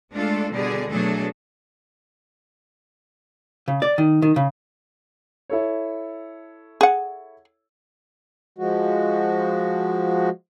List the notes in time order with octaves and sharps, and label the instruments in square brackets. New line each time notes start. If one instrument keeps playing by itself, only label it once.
[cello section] G#3 A3 D4 F4 A4
B2 D3 G3 G#4 D5
B2 F#3 A3 D4 G#4 A4
[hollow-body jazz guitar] C#3
D5
D#3
D#3
C#3
[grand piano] E4 A4 C#5
[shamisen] G#4 F#5
[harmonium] F3 G#3 F#4